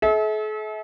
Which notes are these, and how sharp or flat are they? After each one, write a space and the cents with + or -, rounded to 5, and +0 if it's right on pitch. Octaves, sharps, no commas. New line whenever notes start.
A4 -45 E5 -35